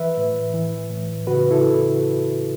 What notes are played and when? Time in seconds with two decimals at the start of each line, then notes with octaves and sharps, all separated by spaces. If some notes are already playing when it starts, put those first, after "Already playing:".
Already playing: E3 B4 E5
0.17 A2
0.54 E3
0.90 A2
1.27 C#3 F#4 B4
1.51 E4 A4